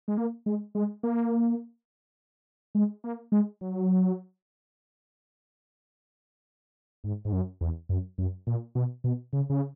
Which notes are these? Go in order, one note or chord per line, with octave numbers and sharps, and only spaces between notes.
G#3
A#3
G#3
G#3
A#3
G#3
A#3
G#3
F#3
G#2
G#2
F#2
E2
F#2
F#2
A#2
B2
B2
C#3
C#3